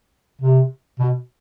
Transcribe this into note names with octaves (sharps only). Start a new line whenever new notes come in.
C3
B2